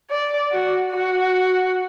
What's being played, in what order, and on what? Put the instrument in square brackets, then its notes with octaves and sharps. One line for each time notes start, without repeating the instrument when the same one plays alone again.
[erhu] D5
F#4
F#4